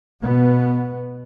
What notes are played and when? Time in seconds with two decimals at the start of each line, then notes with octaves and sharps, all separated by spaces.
0.22 B2 B3